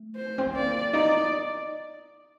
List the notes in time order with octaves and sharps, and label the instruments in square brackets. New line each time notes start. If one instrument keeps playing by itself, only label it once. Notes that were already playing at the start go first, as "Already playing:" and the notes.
Already playing: [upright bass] A3
[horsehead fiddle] C5
[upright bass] C4
B3
[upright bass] A#3 [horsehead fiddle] D5
[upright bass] D#4 [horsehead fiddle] D5